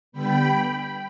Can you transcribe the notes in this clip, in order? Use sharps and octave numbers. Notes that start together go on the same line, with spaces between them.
D3 G3 B3 G5 B5